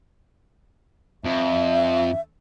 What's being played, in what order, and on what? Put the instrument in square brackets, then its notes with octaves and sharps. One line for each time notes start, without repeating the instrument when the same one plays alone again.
[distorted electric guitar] F2 [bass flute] E5